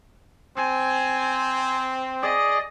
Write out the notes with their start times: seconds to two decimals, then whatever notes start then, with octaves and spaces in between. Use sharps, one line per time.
0.57 C4 G#5
2.22 G#4 D5 D#5